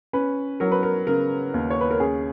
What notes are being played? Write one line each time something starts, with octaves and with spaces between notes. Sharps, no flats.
C#4 B4
F#3 A#4
B4
A#4
C#3 A#4
D#2
C#5
B4
A#4
C#4 G#4